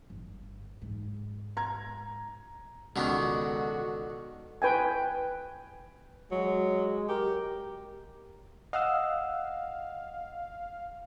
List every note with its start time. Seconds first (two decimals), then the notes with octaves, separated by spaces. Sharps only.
0.10 G1
0.82 G#2
1.57 A#5 G#6
2.96 C#2 B2 D3 D#3 F#4 A4
4.62 B4 G5 G#5
6.32 F#3 G#3
7.09 G4 A#4
8.73 D#5 F5 F#5 E6